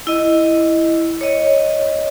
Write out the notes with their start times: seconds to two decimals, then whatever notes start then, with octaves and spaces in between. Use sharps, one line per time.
0.07 E4 D#5
1.21 C#5 D#5